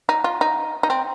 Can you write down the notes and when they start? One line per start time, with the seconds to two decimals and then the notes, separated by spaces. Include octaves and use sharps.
0.09 D#4
0.24 F4
0.41 D#4
0.83 D#4
0.90 C4